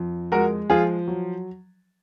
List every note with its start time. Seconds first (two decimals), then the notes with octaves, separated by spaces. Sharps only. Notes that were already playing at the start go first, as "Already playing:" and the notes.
Already playing: F2
0.32 G#3 F#4 A#4
0.70 F3 F4 G#4
1.08 F#3